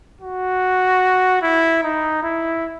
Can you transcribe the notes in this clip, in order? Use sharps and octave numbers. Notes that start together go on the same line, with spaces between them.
F#4
E4
D#4
E4